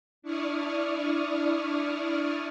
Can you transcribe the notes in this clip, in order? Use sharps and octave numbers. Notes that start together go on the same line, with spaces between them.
D4 E4 D5 C#6 D#6 F6